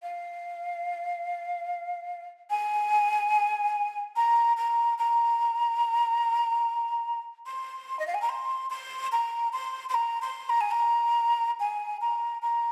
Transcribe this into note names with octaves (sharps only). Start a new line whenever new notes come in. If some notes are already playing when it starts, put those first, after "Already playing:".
F5
G#5
A#5
A#5
A#5
C6
D#5
F5
G#5
A#5
C6
C6
A#5
C6
C6
A#5
C6
A#5
G#5
A#5
G#5
A#5
A#5